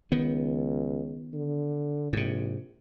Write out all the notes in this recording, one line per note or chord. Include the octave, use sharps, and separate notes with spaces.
C#2 D#3 B3
D3
A#1 G#2 C3